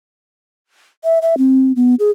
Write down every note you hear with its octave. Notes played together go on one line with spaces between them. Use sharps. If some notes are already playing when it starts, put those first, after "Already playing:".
E5
E5
C4
B3
G#4